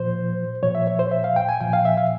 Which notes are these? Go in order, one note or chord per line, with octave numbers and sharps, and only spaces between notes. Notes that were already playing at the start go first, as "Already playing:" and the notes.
Already playing: A#2 F3 C5
A#2 F3 C#5
E5
C#5
C5
E5
F5
G5
G#5
A#2 F3 G5
F5
E5
F5